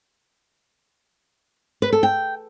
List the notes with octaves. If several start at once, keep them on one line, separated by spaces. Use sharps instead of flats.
B4
A4
G5